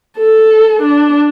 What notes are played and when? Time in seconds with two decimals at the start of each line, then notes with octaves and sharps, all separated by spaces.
0.18 A4
0.82 D4